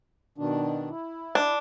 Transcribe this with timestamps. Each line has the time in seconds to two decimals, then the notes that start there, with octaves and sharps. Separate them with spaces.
0.38 B2 D#3 D4
0.90 E4
1.35 D4